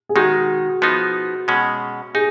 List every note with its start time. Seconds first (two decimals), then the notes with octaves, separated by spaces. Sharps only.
0.09 G#4
0.16 D#3 G#3 D#4 F#4
0.82 F3 B3 D#4
1.48 B2 G#3 C#4
2.14 D#4 G#4